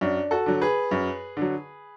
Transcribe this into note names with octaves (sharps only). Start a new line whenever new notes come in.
F#2 D4
F#4 A4
D3 F#3
G#4 B4
F#2
D3 F#3